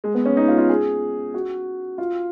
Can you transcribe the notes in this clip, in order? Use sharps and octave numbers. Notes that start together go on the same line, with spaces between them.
G#3
B3
C#4
D#4
F4
F4
G#4
F#4
F4